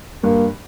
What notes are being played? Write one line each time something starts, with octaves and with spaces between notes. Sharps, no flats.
G2 A#3